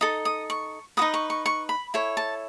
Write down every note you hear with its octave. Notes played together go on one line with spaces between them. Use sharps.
D#4 A4 D#6
D#6
C#6
D#4 F#4 B4 D#6
C#6
C#6
C#6
B5
E4 A4 C#5
A5